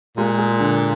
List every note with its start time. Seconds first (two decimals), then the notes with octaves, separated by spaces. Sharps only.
0.17 A#2 G#3
0.38 G#4
0.60 D3